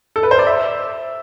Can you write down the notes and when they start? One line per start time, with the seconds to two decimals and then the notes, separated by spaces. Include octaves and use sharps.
0.16 A4
0.23 B4
0.31 C5
0.39 D5
0.47 E5